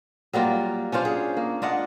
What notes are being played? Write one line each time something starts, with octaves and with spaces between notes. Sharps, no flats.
F#3 G3 A#3 F4
C#4 D4 F4 C5
G#4
A#3
D4 F4 D#5 F#5